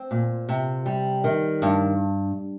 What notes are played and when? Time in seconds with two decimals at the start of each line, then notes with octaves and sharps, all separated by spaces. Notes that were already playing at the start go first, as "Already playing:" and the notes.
Already playing: C4
0.11 A#2
0.49 C3
0.86 G3
1.24 D#3
1.62 G2